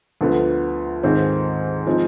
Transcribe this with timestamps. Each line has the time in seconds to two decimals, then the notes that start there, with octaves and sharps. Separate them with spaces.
0.21 D2 D3 F3 B3
1.03 G#2 D#3 G#3 C4
1.87 F3 G#3 C4 D#4